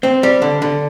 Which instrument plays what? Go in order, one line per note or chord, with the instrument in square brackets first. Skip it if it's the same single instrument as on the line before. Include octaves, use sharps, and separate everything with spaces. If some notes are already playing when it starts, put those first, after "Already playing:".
[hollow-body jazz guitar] C4
G3
D3
D3